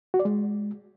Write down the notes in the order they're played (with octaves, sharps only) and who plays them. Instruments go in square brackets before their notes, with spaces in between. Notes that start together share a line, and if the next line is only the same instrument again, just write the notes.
[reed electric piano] F#4
D5
G#3